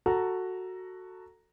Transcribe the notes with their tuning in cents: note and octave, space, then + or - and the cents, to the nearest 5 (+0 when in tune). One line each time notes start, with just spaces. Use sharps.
F#4 +0 A4 +15 A#5 +0